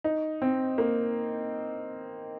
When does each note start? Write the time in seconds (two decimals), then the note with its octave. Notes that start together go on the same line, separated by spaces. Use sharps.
0.04 D#4
0.42 C4
0.78 A#3